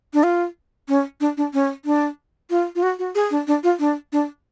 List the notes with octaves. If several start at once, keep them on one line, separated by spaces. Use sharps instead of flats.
D4
F4
C#4
D4
D4
C#4
D4
F4
F4
F#4
F#4
G#4
D4
D4
F4
D4
D4